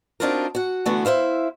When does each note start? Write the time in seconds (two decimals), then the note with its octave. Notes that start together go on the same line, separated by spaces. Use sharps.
0.20 C4 D4 D#4 F4 F#4 A#4
0.55 F#4 F#5
0.86 D3 E3 A3 B3 F#4
1.05 E4 C5 E5 F5